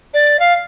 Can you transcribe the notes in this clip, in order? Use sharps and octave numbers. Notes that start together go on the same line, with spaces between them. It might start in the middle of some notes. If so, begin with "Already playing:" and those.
D5
F5